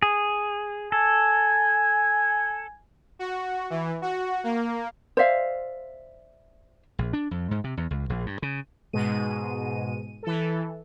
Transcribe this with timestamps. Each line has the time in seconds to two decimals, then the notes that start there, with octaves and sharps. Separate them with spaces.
0.02 G#4
0.92 A4 G#5
3.19 F#4
3.70 E3
4.02 F#4
4.44 A#3
5.17 C5 D5 E5 F5
6.99 A#1
7.13 D4
7.31 F2
7.51 G#2
7.64 C3
7.77 E2
7.91 C#2
8.10 A#1
8.26 G2
8.42 C#3
8.93 G#2 B2 G#3 D#7
10.23 E3 A4